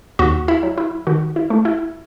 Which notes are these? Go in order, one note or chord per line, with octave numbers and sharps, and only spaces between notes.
D#2 F#4
E4
F#3
E4
D#3 F#4
E4
A3
E4